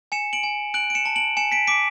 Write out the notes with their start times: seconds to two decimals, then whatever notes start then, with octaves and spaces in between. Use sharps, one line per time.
0.12 G#5 C#7 E7
0.33 D7 F#7
0.43 G#5
0.74 F#6 D7 F#7
0.90 D7
0.95 C#7 E7
1.06 A5
1.16 D7 F#7
1.37 G#5 C#7 E7
1.52 B6 D7
1.67 D6 B6 D7